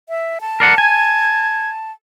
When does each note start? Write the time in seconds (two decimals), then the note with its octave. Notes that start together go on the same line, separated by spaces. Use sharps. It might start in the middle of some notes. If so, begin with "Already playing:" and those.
0.09 E5
0.41 A5
0.60 A#4 D5 F#5 C7
0.78 G#5 G#6